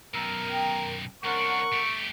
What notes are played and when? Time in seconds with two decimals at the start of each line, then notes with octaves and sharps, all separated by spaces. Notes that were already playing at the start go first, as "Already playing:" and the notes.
0.14 F#2 B2 A#4 A5 E6
0.46 G5 D#6
1.24 C2 A#3 C#4 D4 A#4 C5 F#5 C#6
1.72 A3 G4 A4